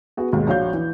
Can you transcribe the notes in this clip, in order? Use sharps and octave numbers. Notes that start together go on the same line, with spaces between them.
B3 F#4 G#4
D#2 G#2 B2
A#1 F#4 C#5 F5 G6
E3